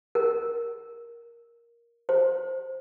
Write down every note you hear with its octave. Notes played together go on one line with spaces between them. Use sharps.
A#4
C5